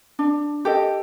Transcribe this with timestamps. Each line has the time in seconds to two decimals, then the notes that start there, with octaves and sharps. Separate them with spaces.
0.19 D4
0.65 G4 A4 D#5